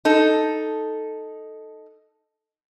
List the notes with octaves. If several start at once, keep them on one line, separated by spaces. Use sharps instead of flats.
D#4 A4